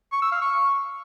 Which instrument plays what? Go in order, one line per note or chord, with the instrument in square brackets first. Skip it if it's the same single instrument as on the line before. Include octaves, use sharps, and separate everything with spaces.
[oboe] C#6
E6
F5
C#6